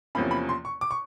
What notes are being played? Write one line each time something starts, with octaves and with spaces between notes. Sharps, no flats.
E2 C3 F3 A#3 C#4 B5
B5
C6
C#6
D6
C#6